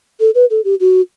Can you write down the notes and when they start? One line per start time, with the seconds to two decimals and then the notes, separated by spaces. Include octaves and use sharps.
0.20 A4
0.35 B4
0.50 A4
0.65 G4
0.80 F#4